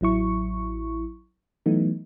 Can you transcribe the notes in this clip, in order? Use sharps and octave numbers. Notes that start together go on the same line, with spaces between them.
A1 F#3 E4 C#6
E3 F#3 A3 B3 D#4